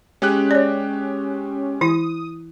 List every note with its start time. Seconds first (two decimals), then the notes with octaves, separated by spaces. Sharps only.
0.22 G#3 C#4 G4 F#6
0.51 C#5 D5
1.81 E3 E4 D#6